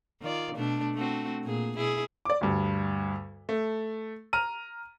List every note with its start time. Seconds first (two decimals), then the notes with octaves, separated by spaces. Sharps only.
0.21 D#3 F4 D5
0.55 B2 A3 D4
0.95 A3 C4 F#4
1.44 A#2 G#4
1.76 B2 E4 G#4
2.25 D5 D6
2.41 D2 G2
3.49 A3
4.33 A#5 F6 D#7